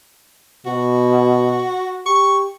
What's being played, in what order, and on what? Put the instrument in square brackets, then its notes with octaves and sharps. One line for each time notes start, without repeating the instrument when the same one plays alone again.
[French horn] B2 [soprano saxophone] F#4
[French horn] G4 [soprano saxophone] C#6